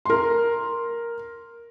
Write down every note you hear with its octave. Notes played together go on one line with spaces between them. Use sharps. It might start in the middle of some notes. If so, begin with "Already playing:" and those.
A#4 C6